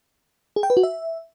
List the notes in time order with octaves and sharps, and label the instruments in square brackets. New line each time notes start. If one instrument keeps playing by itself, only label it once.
[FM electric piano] G#4
G5
B4
F#4
E5